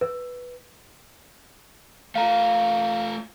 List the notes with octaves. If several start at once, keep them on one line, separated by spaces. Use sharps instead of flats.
B4
A3 F4 F5 A#5